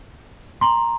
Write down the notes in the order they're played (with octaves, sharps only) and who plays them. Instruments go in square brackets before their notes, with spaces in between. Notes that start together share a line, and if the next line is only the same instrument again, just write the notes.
[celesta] A#5 C6